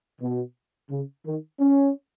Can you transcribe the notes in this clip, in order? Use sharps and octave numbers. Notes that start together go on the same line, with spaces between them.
B2
C#3
D#3
C#4